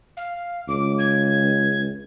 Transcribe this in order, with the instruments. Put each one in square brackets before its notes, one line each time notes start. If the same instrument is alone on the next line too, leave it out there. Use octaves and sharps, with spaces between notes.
[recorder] F5
[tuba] C#2 [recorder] D6
[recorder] G#6